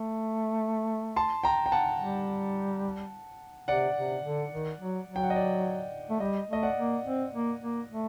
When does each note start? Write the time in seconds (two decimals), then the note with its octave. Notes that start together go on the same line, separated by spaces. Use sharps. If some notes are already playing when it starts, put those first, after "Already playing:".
Already playing: A3
1.16 A5 C6
1.44 G5 A#5
1.66 G5
1.72 F#5 A5
2.00 G3
3.68 C3 D5 F#5
3.97 C3
4.24 D3
4.52 D#3
4.80 F#3
5.09 F#3
5.16 G5
5.23 F#5
5.30 D#5
5.36 D5
6.10 A3
6.20 G3 D#5
6.49 A3 D#5
6.63 D5 F#5
6.78 A#3
7.05 C4
7.33 A#3
7.62 A#3
7.90 A3